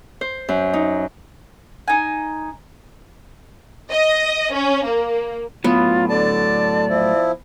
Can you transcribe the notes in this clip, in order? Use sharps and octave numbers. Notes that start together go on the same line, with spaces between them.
C5
F#2
D#4
D#4 G#5
D#5
C#4
A#3
A2 F#3 B3 F4
D3 D5 A5
F3 E4